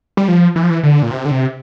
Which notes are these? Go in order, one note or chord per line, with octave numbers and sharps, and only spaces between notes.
G3
F3
E3
F3
E3
D3
A#2
C3
D3
C3